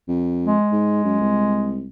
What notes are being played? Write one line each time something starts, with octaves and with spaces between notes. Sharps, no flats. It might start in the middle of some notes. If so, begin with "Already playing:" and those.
F2
G#3
G#2
F#2
C2